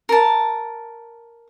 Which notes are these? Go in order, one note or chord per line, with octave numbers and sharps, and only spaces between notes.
A#4 A5